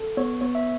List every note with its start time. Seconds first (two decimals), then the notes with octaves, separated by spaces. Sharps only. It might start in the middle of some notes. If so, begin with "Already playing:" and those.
Already playing: A4
0.17 B3 C#5
0.41 B3 C#5
0.55 E5